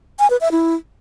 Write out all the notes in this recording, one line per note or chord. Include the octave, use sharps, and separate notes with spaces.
G#5
B4
E5
E4